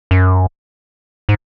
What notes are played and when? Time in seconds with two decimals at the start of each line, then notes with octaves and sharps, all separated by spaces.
0.11 F#2
1.29 G#2